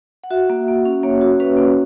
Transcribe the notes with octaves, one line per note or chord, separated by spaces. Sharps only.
F#5
F#4 E5
A#3
A#3
C#4
A#3 C#5
F#4
C#4 B4
A#3